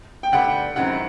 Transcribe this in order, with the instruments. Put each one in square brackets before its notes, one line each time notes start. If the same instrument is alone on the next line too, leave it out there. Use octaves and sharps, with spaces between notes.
[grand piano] G5
[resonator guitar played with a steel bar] G2 D3 G3 B3 [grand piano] F#5
[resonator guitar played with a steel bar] F#2 D#3 G#3 C4 E4 [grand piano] F#5